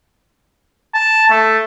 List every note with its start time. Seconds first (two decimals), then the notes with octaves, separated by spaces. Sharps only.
0.94 A5
1.30 A3